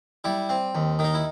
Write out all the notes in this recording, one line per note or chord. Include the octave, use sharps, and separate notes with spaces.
G3 E4
C4
D#2
D#3
D#4
E4